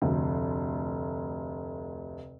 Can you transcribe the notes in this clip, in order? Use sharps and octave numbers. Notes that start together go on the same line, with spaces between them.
F1 D2